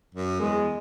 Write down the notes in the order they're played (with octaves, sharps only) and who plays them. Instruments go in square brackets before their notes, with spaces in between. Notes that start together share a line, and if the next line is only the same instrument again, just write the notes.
[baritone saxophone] F#2
[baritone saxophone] E2 [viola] G#3